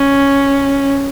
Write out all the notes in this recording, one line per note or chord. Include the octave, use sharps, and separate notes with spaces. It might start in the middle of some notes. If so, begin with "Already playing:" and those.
Already playing: C#4